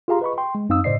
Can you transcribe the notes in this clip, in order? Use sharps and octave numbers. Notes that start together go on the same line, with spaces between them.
F4 G4 G#4 F5 A#5 C6
B4 D#5 B5 C#6
G5 C6
G#3
F#2 C4 D#4 F5 D#6 E6
A2 C#3 C5 D5 D#5 C7